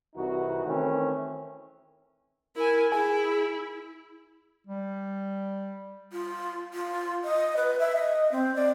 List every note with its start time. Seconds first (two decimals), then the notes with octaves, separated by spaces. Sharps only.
0.16 C2 E3 D#4 F#4
0.65 D#3 E3 A3 C4 C#4
2.56 E4 A#4 G#5
2.92 E4 G#4 G#5
4.67 G3
6.12 F4
6.74 F4
7.25 D#5
7.57 B4
7.79 E5
7.96 D#5
8.32 C4
8.55 D5